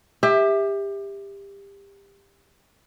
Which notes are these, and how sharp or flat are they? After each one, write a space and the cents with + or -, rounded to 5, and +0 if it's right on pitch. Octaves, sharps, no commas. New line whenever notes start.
G4 +25 E5 -10